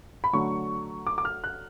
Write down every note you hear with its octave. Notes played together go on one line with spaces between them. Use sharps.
B5
D3 F#3 A3 C#6
D6
D6
F6
F#6